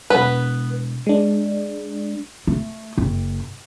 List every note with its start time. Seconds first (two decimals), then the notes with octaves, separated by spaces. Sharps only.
0.10 E1 G#3 B3 B4
1.07 G#3 D4
2.47 A3
2.98 F#1